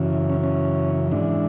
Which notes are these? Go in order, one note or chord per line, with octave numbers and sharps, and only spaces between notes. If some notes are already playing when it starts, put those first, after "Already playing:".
Already playing: F#2 C#3 E3
C#4
C#4
G#2 E3 D4